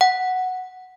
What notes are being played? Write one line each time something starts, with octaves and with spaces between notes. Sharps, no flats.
F#5